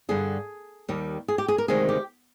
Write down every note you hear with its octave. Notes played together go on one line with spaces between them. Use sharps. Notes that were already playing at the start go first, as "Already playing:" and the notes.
G2 D3 G3 G#4
D#2 D#3 G3
G#4
G4
G#4
A#4
D2 C3 D#3 G#3 G#4
G4